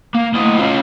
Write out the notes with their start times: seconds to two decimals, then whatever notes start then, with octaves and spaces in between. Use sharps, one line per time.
0.15 A#3
0.35 A2 D#5
0.59 C#4 F4